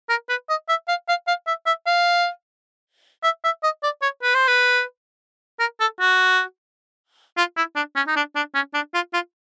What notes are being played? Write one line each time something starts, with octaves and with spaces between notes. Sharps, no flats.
A#4
B4
D#5
E5
F5
F5
F5
E5
E5
F5
E5
E5
D#5
D5
C#5
B4
C5
B4
A#4
A4
F#4
F4
E4
D4
C#4
D#4
D4
D4
C#4
D4
F4
F4